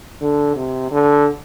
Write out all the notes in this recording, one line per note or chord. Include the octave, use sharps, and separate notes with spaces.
D3
C3
D3